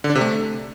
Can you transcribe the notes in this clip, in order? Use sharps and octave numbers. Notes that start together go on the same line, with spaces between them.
D3
D4
C3
A3